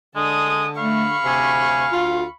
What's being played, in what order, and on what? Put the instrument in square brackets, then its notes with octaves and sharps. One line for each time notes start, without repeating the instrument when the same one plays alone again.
[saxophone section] D3 [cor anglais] G#3 [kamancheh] A5 D#6
[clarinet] A3 [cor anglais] F5 [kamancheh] B5 C#6
[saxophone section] D2 C3 [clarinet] G#5
[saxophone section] D2 F4